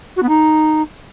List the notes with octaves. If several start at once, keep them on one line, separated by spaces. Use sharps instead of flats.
F#4
B3
D#4